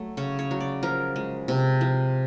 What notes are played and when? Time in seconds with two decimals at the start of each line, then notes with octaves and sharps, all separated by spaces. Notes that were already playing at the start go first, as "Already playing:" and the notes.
Already playing: F#3 A3
0.17 C#3 C#5
0.39 C#5
0.51 F#3
0.60 D5
0.83 F3 A#4
1.16 G#3
1.48 C3
1.81 F3